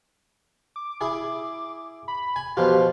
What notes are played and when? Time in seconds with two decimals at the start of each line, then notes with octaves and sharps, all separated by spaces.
0.76 D6
1.01 E4 G#4
2.08 B5
2.36 G#5
2.57 B2 F3 F4 G4